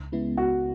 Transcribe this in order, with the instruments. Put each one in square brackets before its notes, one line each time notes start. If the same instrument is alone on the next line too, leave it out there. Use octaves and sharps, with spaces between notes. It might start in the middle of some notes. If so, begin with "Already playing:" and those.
Already playing: [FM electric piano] C#2
C#3 G#3 B3 E4
[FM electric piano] C#2 [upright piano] F#4